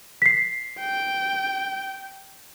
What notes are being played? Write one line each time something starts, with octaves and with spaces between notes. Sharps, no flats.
B6 C7
G5